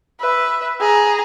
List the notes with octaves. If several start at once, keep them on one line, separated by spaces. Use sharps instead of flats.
B4 E5
G#4 A#5